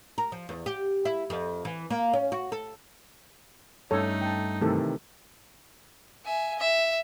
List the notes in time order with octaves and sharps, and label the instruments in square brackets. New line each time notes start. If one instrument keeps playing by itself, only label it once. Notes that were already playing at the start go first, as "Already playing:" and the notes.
[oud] A#4
F3
E2
G4
E4
F2
E3
A#3
C#4
F#4
A4
[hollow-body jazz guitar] G2 C#4 [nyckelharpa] A3 D#4 [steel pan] A4 C#5
[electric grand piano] G5 A5
[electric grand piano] C3 D#3 E3 [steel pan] A3 A4
[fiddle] E5 G#5
E5